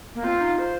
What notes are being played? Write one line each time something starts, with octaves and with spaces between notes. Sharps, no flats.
A#3
C4 F4
D#4
C5